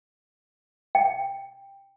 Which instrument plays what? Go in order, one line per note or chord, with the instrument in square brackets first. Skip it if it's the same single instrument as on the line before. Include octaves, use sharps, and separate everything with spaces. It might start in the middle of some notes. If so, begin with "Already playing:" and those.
[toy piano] G5